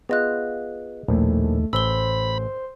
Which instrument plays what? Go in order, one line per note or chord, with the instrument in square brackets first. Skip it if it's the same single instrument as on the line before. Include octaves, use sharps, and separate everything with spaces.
[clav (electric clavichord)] B3 F4 [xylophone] G#4 D#5 F#6
[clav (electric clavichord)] A#1 A2 [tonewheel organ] D#2 [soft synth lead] A3
[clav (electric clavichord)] A1 [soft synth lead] C5 [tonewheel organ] B5 [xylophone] E6 G7